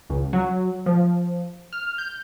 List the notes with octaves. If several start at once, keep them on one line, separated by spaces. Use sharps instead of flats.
C#2
F#3
F3
F6
G6